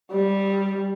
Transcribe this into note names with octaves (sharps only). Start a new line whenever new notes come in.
G3